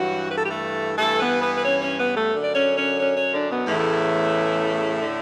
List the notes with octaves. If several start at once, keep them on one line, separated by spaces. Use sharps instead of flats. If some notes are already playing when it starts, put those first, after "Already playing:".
Already playing: G2 E3 F#3 F#4
B4
A4
G4
A3 A4
G2 E3 A3 A4
B3 B4
B3 B4
B4
C#4 C#5
C#4 C#5
B3 B4
A3 A4
F#2 D3
D5
C#4 C#5
C#4 C#5
C#4 C#5
C#4 C#5
D3 D4
B2 B3
E2 A2 C#3 E3 A3
D3